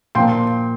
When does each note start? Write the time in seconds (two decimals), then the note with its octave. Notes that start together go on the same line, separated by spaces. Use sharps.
0.15 A#2 F3 A#3 G5 C6